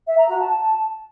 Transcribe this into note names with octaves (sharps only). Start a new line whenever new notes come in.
E5
A#5
F#4
A5